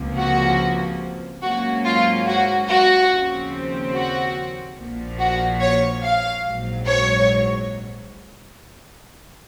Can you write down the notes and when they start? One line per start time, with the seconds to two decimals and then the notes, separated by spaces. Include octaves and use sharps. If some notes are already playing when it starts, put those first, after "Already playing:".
Already playing: C#2 C3 F3 A#3
0.17 F#4
1.42 G#2 F#3 A#3 C#4 F#4
1.84 F4
2.26 F#4
2.68 F#4
3.10 D#2 C#3 F3 C4
3.93 F#4
4.77 A#1 A#2 F3
5.19 F#4
5.61 C#5
6.03 F5
6.44 A#1 G#2 F#3
6.86 C#5